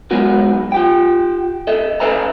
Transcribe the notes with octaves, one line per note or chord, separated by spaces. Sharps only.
F#3 G#3 B3 F#4 A#4
F4 G4 G5
A4 D#5 E5
A4 B4 E5 G#5 A#5